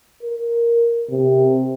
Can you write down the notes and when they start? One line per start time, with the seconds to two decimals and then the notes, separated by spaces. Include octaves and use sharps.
0.23 A#4
1.10 C3